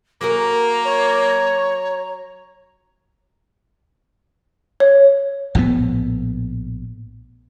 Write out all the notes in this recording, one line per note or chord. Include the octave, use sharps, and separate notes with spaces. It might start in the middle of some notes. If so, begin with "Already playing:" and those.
F#3 A#3 G#4 A#4 A#5
C#5
C#5
A#1 A2 C#3 B3